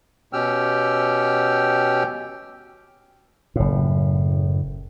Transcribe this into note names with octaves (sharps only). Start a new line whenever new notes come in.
B2 C#4 G4 G5 E6 F6
F#1 A2